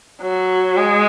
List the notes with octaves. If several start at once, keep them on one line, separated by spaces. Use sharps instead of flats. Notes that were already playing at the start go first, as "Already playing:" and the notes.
F#3
G#3